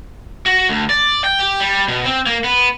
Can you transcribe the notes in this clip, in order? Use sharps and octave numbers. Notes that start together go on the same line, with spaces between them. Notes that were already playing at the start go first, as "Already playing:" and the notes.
F#4
D2
D5
G5
G4
G3
B2
C4
A#3
B3